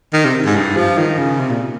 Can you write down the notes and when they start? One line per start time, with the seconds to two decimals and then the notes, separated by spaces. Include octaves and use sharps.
0.13 D#3
0.25 C3
0.46 G#2
0.55 G2
0.77 F3
0.98 D#3
1.18 C#3
1.40 C3
1.50 A#2